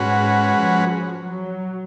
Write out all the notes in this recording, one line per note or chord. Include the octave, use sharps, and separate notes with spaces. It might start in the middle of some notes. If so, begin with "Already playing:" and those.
Already playing: G#2 G#3 C#4 F#4 B4
F3
F#3